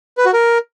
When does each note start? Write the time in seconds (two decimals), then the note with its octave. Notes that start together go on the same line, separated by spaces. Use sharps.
0.18 B4
0.26 F#4
0.34 A#4